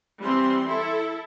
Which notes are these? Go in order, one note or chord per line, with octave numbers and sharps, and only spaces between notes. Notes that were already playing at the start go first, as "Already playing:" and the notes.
E3 G3 C4 C6
E4 A4